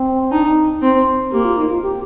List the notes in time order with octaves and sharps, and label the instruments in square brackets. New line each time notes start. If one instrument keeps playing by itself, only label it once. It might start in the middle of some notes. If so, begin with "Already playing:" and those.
Already playing: [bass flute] C4
[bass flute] D4 [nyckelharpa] D#4
[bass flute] D#4
[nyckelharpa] C4
[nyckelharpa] A#3 [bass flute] G4
[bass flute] F4
D#4
F4
G4